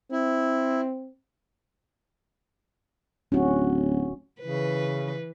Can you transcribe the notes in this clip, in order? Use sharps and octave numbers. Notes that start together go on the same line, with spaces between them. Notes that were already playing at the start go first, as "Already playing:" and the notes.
C4 E4
D1 C#4 F#4
C#3 E3 B4